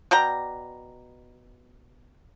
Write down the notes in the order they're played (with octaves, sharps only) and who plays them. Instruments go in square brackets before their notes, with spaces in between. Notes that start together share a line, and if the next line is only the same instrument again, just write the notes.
[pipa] B2 D5 G5 A#5